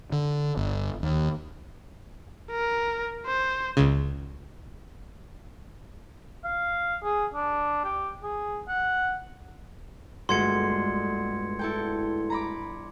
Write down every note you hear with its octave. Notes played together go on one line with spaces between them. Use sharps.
D3
G1
D#2
A#4
C5
C#2 C#3
F5
G#4
D4
G4
G#4
F#5
G1 G#3 A3 F#4 C6 G#6 C#7
E4 A4 G5
A#5 B5 D6